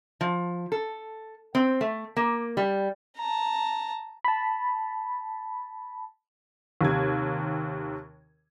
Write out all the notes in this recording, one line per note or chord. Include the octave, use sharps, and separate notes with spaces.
F3
A4
C4
A3
A#3
G3
A5 A#5
A5 B5
D#2 C3 G#6